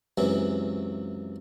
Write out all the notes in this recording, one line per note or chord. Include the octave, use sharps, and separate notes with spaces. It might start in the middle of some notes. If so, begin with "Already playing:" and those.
C#2 F#2 C3 E3